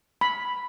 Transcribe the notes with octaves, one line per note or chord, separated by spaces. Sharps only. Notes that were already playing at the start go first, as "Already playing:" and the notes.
B5